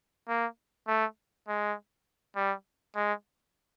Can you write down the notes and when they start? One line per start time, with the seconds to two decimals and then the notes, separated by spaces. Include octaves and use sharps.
0.28 A#3
0.87 A3
1.48 G#3
2.36 G3
2.95 G#3